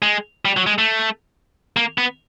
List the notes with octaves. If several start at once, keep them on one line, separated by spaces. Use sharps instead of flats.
G#3
G3
F#3
G#3
A3
A#3
B3